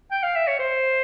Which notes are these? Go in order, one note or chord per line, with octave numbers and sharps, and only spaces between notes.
G5
F5
E5
C#5
C5